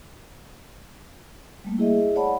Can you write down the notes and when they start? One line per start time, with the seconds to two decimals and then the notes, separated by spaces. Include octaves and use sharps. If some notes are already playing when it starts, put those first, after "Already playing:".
1.64 G3 A3 A#3
1.78 E4 G#4 D#5 E5
2.16 C#5 D5 F#5 A5 B5